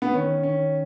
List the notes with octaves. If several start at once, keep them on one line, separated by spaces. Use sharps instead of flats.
B3
D#3 C#4
D#3 C#4